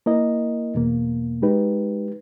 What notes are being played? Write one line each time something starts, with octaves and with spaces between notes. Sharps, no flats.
A#3 E4 A#4 D#5
E2 B2 A#3
G#3 D#4 G4 B4